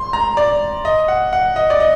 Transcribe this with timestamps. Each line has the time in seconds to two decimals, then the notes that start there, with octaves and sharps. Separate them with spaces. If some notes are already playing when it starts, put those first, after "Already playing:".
Already playing: C6
0.13 A#5
0.37 D5
0.85 D#5
1.08 F#5
1.33 F#5
1.56 D#5
1.70 D5
1.80 D#5